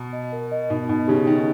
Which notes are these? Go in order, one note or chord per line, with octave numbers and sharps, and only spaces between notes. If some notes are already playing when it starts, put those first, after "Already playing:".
Already playing: B2 A#5
D#5
A#4
D#5
B2 D#4
B2 D#4
C#3 G4
D#3 D#4